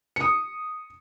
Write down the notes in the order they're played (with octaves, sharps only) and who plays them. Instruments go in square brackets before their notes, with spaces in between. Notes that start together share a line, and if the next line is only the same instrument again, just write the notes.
[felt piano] D#6 C#7